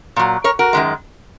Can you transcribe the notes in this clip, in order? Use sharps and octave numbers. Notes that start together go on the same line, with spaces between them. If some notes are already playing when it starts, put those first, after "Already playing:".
A#2 F#3
A#4 C#5
F#4 A#4
F#2 D#3 G#3